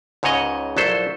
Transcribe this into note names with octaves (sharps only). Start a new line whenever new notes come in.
C#2 G#2 C#3 C#5 D#5 F#5
A#1 F#3 E4 A4 C5